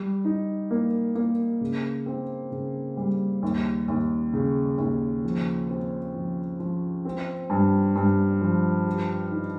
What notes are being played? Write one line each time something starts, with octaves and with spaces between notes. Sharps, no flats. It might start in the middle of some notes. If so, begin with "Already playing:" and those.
Already playing: G3
D#4
A#3
A#3
C#3
C4
C#3
G3
D#2
D#2
C#3
D#2
F3
C4
F3
F3
C4
G2
G2
F3
G4
D#3